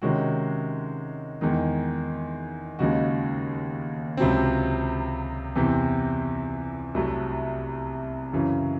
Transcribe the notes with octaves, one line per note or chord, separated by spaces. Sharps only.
C3 D#3 G#3 C#4 F#4
E2 D#3 G#3 D#4
D#2 C#3 G#3 D#4 F#4
C#2 C3 F#3 C4
E2 C3 E3 C4
C2 C3 F#3 A3
F#2 C#3 E3